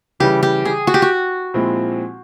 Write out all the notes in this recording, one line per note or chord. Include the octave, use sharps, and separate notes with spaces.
C#3 E3 G3 G4
G4
G#4
F#4
G4
F#4
A#2 F3 G#3 C4 E4